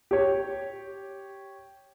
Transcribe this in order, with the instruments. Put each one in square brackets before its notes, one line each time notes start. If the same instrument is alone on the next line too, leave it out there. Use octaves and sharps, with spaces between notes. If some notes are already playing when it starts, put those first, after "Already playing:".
[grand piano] G4 C#5